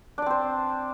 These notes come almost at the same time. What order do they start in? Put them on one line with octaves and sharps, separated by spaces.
D4 D5 C4 C5